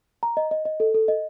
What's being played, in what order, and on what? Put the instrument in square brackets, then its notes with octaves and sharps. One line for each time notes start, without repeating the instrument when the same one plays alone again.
[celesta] A#5
D#5
D#5
D#5
A4
A4
D#5